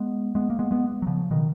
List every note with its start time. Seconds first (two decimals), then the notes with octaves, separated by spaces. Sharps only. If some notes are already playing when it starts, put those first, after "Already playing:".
Already playing: G#3 B3
0.35 G#3 B3
0.50 A#3
0.59 G#3 B3
0.71 G#3 B3
1.02 F#3
1.07 C#3 F3
1.31 B2 D#3